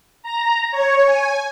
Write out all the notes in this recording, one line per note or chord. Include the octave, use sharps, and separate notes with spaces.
A#5
C#5
G#5